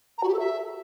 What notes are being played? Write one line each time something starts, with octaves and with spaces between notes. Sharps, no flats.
A#5
F#4
G4
A4
E5